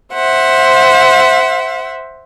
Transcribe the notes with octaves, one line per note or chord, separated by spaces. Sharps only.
C5 E5 F#5